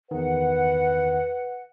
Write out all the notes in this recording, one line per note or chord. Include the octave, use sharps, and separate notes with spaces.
E2 D#3 B4 F#5